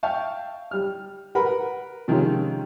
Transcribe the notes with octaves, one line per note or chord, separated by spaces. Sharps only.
E5 F5 G5 A5 C#6
G3 F6
A#4 B4 F#5 A#5 B5
C3 D#3 F3 G#3 C#4 F4